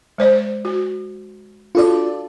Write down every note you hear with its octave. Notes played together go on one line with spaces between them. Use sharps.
G#3 C5 D5
F#4
D4 F4 F#4 A4 D5